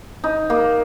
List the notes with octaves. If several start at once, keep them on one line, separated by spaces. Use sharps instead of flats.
D#4
A#3